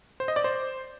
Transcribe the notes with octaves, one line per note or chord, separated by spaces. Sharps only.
C5
D#5
D5
C5